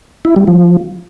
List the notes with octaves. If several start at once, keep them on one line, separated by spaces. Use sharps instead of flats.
E4
G3
F3